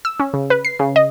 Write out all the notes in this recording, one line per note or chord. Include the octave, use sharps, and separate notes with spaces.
E6
C#4
C#3
B4
C7
C#3
D#5